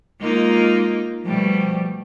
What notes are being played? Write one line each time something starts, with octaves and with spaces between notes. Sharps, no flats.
G#3 A#3 D#4 F4
B2 F3 G3 A3